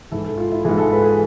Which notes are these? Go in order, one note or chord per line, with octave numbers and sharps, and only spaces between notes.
G#2 E3 A4
A4
F4
E4
G#2 E3 G#4
A4
B4
G#4